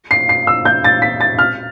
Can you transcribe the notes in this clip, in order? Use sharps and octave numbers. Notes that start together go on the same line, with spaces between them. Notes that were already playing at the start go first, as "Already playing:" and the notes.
C7
C7
E6
G6
A6
B6
A6
F6